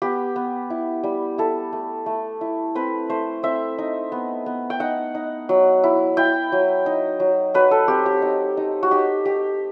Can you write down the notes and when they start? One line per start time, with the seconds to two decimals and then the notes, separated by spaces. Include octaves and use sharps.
0.02 B3 G4
0.36 B3
0.70 E4
1.04 G3
1.38 E4 A4
1.73 A3
2.06 A3
2.41 E4
2.75 C4 B4
3.09 A3 C5
3.43 C4 E5
3.78 D#4
4.12 B3
4.46 B3
4.70 G5
4.80 D#4 F#5
5.15 D#4
5.49 F#3
5.84 E4
6.17 E4 G5
6.52 F#3
6.86 D#4
7.20 F#3
7.54 F#3 B4
7.71 A4
7.88 C4 G4
8.06 G4
8.22 D#4
8.57 D#4
8.83 F#4
8.91 D#4 G4
9.25 D#4 G4